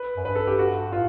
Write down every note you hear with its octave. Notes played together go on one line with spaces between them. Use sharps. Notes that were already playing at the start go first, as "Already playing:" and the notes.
Already playing: B4
F#2
G2 B4
A4
G4
F#4
A2 F4